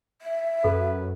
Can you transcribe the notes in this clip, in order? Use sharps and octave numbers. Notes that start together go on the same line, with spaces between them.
E5
F#2 A4 B4